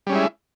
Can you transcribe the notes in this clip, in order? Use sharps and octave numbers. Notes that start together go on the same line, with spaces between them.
G3 G#3 C#4 E4